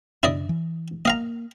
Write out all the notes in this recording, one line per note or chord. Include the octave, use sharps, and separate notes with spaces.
F#2 C#3 D4 E4 D5 D#5
E3
A#3 D#5 F5 A#5